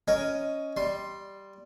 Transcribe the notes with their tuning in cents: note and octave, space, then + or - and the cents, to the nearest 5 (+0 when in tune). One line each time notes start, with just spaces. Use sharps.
C#4 +5 A#4 +0 D#5 +0
G3 +0 C6 +10